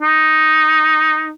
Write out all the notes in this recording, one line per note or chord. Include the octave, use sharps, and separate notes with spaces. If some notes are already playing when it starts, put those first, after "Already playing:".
D#4